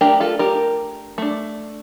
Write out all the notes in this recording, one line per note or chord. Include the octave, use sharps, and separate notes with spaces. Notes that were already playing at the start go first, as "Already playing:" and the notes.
A3 D4 G4 A#4
F4 A4
G4 A#4
A3 D4